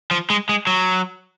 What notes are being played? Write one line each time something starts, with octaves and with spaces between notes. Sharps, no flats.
F3
G#3
G#3
F#3